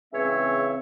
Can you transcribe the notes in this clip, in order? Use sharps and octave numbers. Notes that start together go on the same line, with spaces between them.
C#2 C#3 E3 C4 C#5 E5